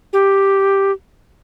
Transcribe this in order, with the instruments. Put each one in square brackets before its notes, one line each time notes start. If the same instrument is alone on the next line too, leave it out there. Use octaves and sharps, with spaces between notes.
[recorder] G4